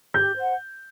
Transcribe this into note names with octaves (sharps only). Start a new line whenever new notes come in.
G4 G6
C5 F#5